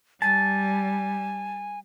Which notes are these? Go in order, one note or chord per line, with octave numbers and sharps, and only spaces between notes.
G3 G#5 A5